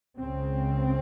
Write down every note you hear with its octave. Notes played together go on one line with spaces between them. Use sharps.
C#2 C#3 C4